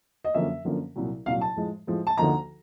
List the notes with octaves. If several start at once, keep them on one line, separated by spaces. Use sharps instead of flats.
D#5
F#2 D3 F3 A#3 C#4 E5
F#2 D3 F3 A#3 C#4
C2 A#2 F#3
C2 A#2 F#3 F5
A5
A2 F3 G#3
A2 F3 G#3
A5
D2 D3 F3 A#3 D#4 A#5